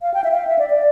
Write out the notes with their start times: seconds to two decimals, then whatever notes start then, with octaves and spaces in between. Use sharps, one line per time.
0.02 F5
0.14 G5
0.24 E5
0.31 F5
0.47 E5
0.59 D5
0.70 D5